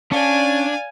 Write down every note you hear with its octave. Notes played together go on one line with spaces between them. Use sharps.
C#4 D4 D5 F5 G#5 C#6